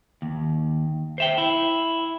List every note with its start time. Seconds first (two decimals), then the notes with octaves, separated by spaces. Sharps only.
0.22 D#2
1.18 C5 E5 G5
1.38 E4